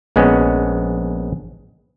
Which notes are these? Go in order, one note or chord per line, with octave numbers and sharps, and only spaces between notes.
A#1 G#3 B3 C#4